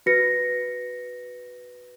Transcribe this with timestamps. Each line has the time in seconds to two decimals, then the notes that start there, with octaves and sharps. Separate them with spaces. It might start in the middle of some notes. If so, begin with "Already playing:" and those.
0.06 F#4 B4 A#6 C#7